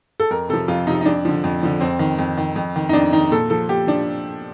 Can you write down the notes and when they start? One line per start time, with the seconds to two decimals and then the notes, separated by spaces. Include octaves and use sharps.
0.20 A4
0.31 F2 A#4
0.49 C3 F3 A4
0.68 F2 F4
0.87 C3 F3 D#4
1.01 D#4
1.06 F2 D4
1.25 D3 F3
1.44 F2
1.63 D3 F3
1.81 F2 C4
1.99 D#3
2.18 F2
2.37 D#3
2.56 F2
2.76 D#3
2.89 D#4
2.93 F2 D4
3.12 D#3 D#4
3.31 A#2 A4
3.50 F3 A4
3.69 A#2 G4
3.87 F3 D4